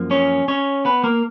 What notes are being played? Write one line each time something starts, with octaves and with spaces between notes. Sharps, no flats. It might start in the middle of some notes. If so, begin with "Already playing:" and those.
Already playing: F#2 F3 A#3
C#4 C#5
C#4 C#5
B3 B4
A#3 A#4